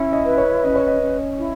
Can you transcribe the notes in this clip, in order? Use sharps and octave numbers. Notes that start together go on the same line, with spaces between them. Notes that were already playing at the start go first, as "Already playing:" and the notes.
Already playing: C#4 E4 E5
D#5
B4
C#5
C#4 D#5
C#5
D#5
C#4
E4